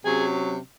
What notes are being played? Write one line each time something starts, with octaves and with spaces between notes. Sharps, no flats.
C3 F#3 C#4 G#4